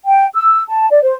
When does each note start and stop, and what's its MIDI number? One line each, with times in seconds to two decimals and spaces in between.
0.06 0.26 79
0.35 0.62 88
0.68 0.88 81
0.91 1.00 74
1.03 1.14 72